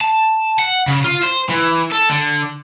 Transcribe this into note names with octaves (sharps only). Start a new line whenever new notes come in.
A5
F#5
C#3
F4
C5
E3
A4
D3